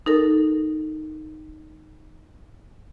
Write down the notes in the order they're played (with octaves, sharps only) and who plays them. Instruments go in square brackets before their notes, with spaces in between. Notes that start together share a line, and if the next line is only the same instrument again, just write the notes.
[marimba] D#4 A4 A#4